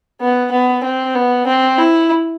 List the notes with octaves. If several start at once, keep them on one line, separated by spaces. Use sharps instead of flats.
B3
B3
C4
B3
C4
E4